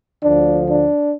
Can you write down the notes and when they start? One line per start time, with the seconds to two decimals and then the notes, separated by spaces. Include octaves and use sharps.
0.24 D2 D3 F3 D4
0.69 D4